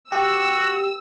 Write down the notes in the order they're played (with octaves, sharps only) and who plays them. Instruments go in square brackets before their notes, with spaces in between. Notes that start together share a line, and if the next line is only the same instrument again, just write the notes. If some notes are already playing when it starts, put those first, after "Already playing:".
[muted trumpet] F#4 [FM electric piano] G4 [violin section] E6